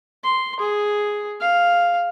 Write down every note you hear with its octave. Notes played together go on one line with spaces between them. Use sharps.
C6
G#4
F5